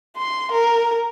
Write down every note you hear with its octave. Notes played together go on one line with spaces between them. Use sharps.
C6
A#4